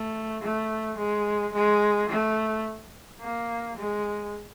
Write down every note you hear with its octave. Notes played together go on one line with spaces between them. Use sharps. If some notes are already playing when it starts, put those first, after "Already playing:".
Already playing: A3
A3
G#3
G#3
A3
A#3
G#3